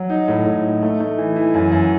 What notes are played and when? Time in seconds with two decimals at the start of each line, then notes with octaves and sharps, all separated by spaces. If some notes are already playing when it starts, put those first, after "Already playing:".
Already playing: F#3
0.10 D#4
0.28 A2
0.46 A2
0.64 D#4
0.82 A3
1.00 A3
1.18 E3
1.36 E3
1.54 F#2
1.72 F#2